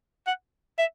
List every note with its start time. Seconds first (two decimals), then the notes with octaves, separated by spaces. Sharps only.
0.27 F#5
0.78 E5